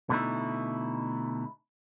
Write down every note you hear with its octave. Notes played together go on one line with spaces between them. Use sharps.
B2 D3 A3 D#4 E4